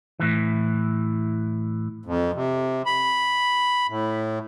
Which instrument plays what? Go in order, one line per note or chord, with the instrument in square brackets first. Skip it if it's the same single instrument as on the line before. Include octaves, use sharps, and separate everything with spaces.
[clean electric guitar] A2 E3
[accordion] F2
C3
B5
A2